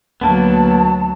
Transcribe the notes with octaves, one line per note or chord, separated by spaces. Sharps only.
D2 F#3 A#3 B3 A5